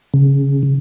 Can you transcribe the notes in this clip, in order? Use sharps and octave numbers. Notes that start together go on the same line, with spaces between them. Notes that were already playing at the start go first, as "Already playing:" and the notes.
C#3